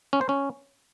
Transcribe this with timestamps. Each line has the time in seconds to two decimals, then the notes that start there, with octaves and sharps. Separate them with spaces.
0.13 C#4
0.21 C5
0.29 C#4